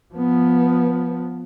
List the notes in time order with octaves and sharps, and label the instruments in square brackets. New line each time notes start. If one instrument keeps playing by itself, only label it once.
[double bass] F3 B3